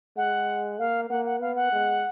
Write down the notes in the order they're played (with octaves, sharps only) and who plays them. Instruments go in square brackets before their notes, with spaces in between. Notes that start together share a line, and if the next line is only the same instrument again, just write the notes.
[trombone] G#3 [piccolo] F#5
[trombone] A#3 [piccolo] F5
[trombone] A#3 [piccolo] F#5
[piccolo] F#5
[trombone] B3 [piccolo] F5
[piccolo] F#5
[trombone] G#3